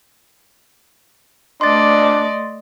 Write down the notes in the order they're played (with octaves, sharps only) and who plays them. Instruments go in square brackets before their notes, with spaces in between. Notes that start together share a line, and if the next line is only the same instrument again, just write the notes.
[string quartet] A3 D5 D#5 [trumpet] D4 [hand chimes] C6 A6